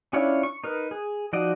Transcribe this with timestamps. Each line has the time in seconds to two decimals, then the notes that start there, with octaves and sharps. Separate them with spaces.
0.13 C#4 D4 E4 F4 C#5
0.43 C#6
0.64 D#4 A#4 B4
0.91 G#4
1.33 F3 D#4 F#4 D5 D#5